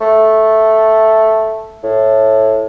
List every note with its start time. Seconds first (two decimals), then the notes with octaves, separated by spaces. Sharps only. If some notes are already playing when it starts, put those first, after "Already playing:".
0.01 A3
1.84 A2